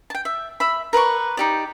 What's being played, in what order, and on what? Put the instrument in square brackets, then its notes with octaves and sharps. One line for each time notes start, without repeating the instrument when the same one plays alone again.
[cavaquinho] G5 A5
E5
E5 B5
A#4 B4 D5 C#6
D#4 G4 D5